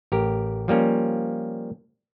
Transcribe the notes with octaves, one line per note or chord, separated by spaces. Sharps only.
A1 G4 A#4
F3 G3 A#3 C#4